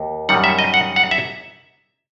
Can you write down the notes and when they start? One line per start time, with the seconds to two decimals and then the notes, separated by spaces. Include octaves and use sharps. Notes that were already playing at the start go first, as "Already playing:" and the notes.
Already playing: D#2
0.29 F#2 D#3 G3 F#5
0.44 E5
0.59 D#5
0.74 F#5
0.96 F#5
1.11 E5